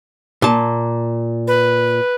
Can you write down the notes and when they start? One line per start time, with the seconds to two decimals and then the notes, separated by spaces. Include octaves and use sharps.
0.42 A#2 A5
1.47 B4